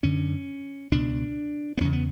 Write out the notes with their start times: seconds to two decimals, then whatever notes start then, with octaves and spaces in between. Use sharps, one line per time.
0.03 F#2 D3 C#4
0.92 C#2 B2 D4
1.77 B3
1.80 E2 C#3 C#4
1.93 B3